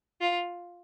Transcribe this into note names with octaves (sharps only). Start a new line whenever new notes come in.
F4